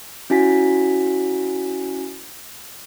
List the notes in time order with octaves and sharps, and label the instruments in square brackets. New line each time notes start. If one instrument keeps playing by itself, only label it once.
[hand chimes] C#4 E4 F#4 G#5 B6